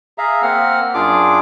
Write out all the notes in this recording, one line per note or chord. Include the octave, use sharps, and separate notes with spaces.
G#4 E5 F5 A#5
A#3 C4 F#5 F6
F#2 D4 F4 G#4 D6